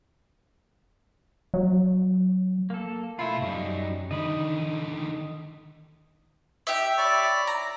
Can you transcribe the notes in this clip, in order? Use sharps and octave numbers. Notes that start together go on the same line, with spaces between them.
F#3
A#3 A4
B2 A3 E4 F4 B5
F#2 F#3 G3 D#4
D3 D#3 D#5 B5
G4 E5
E4 C#5 D5
A#5